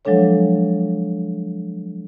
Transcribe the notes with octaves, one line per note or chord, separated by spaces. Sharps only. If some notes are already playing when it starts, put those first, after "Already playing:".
F3 F#3 G#3 D4 A4 C#5